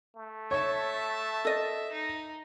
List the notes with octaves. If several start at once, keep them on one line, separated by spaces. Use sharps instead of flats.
A3
C#5 E5 A5
A4 D#5
D#4